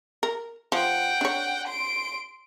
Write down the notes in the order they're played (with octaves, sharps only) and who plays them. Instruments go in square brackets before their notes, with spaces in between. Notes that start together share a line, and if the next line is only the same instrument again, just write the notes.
[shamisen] A#4
[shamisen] F3 [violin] F#5 G5
[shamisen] D4 C#5
[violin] C6 D7